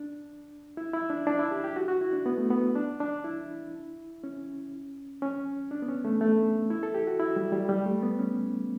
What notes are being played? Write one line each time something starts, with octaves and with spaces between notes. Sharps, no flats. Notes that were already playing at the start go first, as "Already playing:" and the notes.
Already playing: D4
E4
E4
D4
D4
E4
G4
G4
F#4
F#4
E4
D4
B3
A3
B3
D4
D4
E4
C#4
C#4
D4
B3
C#4
A3
A3
E4
A4
G4
F#4
E4
G3
G3
G3
A3
B3
C#4